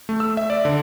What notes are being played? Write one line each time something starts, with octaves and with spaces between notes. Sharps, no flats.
A3
E6
E5
D5
D3